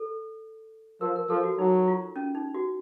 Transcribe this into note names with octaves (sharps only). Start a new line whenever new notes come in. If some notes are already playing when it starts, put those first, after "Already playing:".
Already playing: A4
F3 A#4
A#4
F3 A4
F#4
F#3 D#4
F4
C#4
D#4
F#4